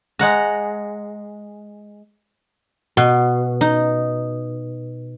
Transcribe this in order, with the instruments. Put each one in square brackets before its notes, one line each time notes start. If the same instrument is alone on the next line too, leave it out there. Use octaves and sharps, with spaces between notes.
[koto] G#3 F#5 A#5
[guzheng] B2
D#4